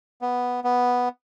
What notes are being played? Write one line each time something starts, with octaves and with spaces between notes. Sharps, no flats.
B3
B3